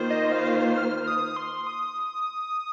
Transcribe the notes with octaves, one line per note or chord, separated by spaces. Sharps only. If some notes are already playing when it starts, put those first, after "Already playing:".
Already playing: D#3 A#3 F4 C5
D#5
F5
F6
D#6
C6
D#6